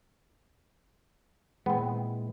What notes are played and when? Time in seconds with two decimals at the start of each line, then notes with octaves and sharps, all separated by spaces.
1.66 A#2 E3 G#3 B3 C4